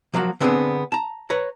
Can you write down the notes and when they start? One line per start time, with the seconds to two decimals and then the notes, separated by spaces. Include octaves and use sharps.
0.14 F3 F#3 A#3 F4 F#4
0.40 D3 B3 C4 D4 G4 G#4
0.92 A5 A#5
1.30 B4 C#5 A#5